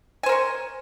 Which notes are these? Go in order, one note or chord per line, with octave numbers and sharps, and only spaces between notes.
A#4 C5 C#5 G#5